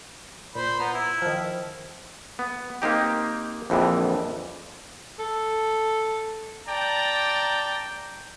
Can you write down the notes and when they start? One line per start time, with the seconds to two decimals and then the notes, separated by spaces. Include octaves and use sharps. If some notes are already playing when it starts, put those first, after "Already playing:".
0.55 A#2 C5 B5
0.80 B3 A#5
0.94 E4
1.22 D#3 F3
2.39 B3
2.82 A#3 C4 D#4 G4
3.70 A#1 F2 D3 E3
5.19 A4
6.68 D5 G5 A5 A#5